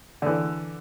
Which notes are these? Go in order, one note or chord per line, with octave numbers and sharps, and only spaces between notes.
D3 E3